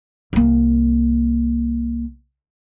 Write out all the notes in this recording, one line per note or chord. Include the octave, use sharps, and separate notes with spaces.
C2 A#3